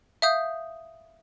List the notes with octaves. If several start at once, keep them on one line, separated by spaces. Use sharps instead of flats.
E5 F5 D#6 G6